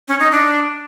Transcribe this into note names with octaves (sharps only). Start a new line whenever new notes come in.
C#4
D#4
D4